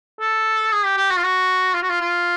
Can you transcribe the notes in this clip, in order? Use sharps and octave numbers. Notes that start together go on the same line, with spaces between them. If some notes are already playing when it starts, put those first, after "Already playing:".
A4
G#4
G4
G4
F#4
F4
F#4
F4
F#4
F4
F4